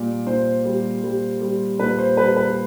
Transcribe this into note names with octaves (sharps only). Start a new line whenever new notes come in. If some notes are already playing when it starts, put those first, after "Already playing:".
Already playing: A#2 G3 D5
A#2 C5
G3
G3
G3
A#2 B4
C5
G3 B4
B4